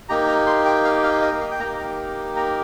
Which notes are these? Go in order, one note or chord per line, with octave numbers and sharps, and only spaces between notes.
A#3 D#4 G4 A#5
A#5
C6
G5
F5
F5
D#5
F5
G5
A#3 D#4 G4 A#5
A#5